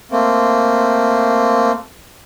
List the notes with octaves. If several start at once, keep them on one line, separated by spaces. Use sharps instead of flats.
A3 A#3 C4